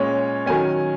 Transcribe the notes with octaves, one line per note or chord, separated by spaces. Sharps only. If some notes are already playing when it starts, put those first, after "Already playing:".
Already playing: A#2 G#3 C#4 C#5
D#3 F#3 C#4 G#5